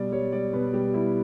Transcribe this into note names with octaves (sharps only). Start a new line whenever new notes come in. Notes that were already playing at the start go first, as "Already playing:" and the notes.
Already playing: B2 G3 D5
G3 C#5
G3 D5
B2 B4
G3 G4
G3 E4